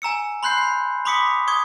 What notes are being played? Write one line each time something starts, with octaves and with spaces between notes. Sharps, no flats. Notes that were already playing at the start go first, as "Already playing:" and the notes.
G#5 A#5 E6 C#7
B5 C6 F#6 G6 C7
C7
B5 C6 D6 D#6 B6 C#7
C#6 D#6 G#6